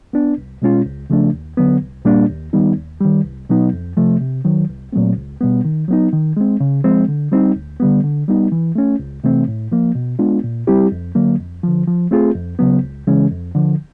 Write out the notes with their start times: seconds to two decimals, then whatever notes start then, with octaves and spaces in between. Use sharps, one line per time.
0.13 B3 D4
0.38 C2
0.62 B2 G#3 C#4 F4
0.86 C#2
1.10 C#3 F3 A3 D4
1.33 D#2
1.57 D3 F#3 B3
1.82 C2
2.05 A#2 G3 A#3 D4
2.29 D#2
2.53 D#3 G3 B3 D#4
2.78 D#2
3.01 D#3 G3
3.25 C2
3.49 B2 F#3 B3 D#4
3.73 F2
3.97 C3 F3 A3
4.21 C3
4.45 D#3 F#3
4.69 C2
4.93 A#2 F#3 A3 C4
5.16 C#2
5.41 B2 G3 B3
5.64 D#3
5.88 F#3 B3 D#4
6.13 D#3
6.37 G#3 C4
6.60 C#3
6.84 F3 G#3 C4
7.08 D3
7.32 G3 C4 D#4
7.56 D2
7.80 D3 G3 B3
8.03 D3
8.28 G3 B3 D#4
8.52 E3
8.75 A3 C#4
8.99 C#2
9.24 C3 E3 A3 C4
9.48 A2
9.72 F3 A#3
9.95 B2
10.19 G#3 B3 D4 F4
10.44 A#2
10.67 G3 C4 E4 G4
10.92 F2
11.15 D3 F#3 A#3
11.39 F2
11.63 D3 F3
11.87 F3
12.11 A3 C4 F4 G#4
12.35 F2
12.59 C#3 F#3 B3
12.83 C#2
13.07 C#3 E3 G#3 C#4
13.31 F2
13.55 D3 F3